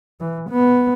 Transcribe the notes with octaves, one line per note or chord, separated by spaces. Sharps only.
E3
B3